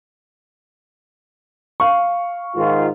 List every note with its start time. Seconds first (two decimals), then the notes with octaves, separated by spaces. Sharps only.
1.80 F5 C#6
2.57 G#2 D#3 F4